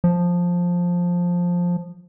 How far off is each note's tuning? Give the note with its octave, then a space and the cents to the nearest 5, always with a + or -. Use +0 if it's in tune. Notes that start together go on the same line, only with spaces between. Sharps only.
F3 +10